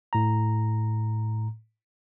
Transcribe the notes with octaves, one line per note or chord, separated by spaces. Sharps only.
A2 A#5